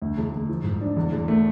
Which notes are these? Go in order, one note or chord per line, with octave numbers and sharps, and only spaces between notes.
D2
E1
E1
F3
G#2
D4
E2
E1
A3